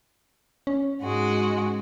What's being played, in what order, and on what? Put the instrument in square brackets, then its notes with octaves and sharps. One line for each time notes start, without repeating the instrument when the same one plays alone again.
[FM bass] C#4
[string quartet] G#2 G#3 F#4